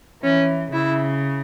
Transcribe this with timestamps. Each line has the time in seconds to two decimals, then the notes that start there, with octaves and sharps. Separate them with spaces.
0.23 E3 C#4
0.73 C#3 E4